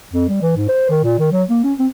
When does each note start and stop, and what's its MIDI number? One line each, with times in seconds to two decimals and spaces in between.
0.13 0.26 41
0.29 0.41 55
0.42 0.52 52
0.56 0.68 44
0.69 0.87 72
0.90 1.01 51
1.04 1.16 46
1.19 1.28 51
1.32 1.43 54
1.50 1.59 58
1.64 1.73 61
1.79 1.86 60